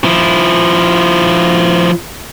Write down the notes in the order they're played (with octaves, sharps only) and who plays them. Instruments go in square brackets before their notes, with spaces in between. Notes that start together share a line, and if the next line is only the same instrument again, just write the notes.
[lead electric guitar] F3 E4